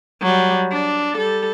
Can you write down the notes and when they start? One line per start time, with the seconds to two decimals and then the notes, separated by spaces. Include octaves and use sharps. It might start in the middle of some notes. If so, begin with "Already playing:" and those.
0.22 F#3 G3
0.72 D4
1.17 G3 A4